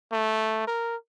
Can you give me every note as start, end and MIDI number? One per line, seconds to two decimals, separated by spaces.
0.12 0.65 57
0.67 0.96 70